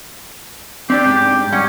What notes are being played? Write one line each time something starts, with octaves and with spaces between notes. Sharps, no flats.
C4 D4 G4 D5
G#2
G3 C#4 F#5 G5